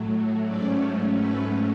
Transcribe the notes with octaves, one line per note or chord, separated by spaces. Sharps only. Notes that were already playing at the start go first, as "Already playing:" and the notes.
Already playing: A2 F#3 A3
G#2 F#3 A3 C#4 D5
B4